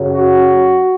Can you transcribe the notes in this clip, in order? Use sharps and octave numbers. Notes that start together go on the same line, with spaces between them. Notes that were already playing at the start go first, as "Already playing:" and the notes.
Already playing: F#2 C#3 F#3
F#4